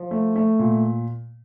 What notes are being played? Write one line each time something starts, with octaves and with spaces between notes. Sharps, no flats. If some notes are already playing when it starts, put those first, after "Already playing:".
Already playing: F3
A3
A3
A#2